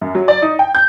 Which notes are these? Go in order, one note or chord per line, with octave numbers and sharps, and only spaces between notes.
F#2
F#3
D5
D#4
G5
G6